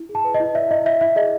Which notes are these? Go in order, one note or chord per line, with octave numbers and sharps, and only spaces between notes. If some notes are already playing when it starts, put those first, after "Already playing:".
Already playing: E4
G#4
A5
B4
D#5
E4
D5 E5
E4 D#5
E4 E5
E4 E5
G#4 D#5